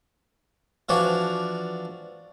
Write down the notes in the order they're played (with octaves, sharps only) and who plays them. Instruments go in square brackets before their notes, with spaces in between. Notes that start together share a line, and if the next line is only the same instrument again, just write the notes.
[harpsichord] E3 F3 D4 F#4